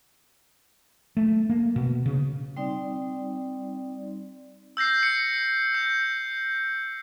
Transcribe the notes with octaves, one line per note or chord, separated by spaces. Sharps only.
A3
A#3
B2
C#3
G3 C4 D#4 D5
E6 G6 A#6 C7
C#7
G6